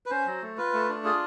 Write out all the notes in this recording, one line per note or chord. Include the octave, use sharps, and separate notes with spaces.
B4
C#4 C5
F#3
A3
F4 B4
A3
D4
F4 G#4